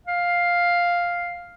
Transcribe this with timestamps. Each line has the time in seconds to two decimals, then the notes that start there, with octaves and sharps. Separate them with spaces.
0.07 F5